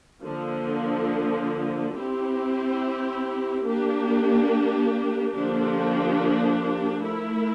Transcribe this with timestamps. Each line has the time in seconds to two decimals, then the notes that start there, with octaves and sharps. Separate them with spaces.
0.24 D3 F3 A#3
1.94 C4 E4 G4
3.63 A#3 D4 G4
5.33 D3 F3 A#3 D4 G4
7.03 A3 E4 A#4